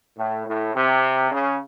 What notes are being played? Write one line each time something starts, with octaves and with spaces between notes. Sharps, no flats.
A2
A2
C3
C#3